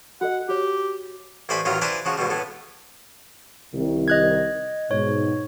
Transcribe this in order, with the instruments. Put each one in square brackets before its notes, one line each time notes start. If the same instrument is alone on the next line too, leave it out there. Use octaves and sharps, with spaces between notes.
[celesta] F#4 A4 D#5 [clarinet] F#5
[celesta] F#4 C#5 [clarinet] G4
[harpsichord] A1 A2 C5 D5 G#5 B5
A1 D#3 F#3 F4 A#5
E4 B4 C5 D5 G#5 A#5
C#3 F3 F#4
D#2 G#2 B2 G3
A2 A3 B3
[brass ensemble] C2 D#3
[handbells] D#5 F#6 G#6
[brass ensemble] G#2 B2 [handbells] C#5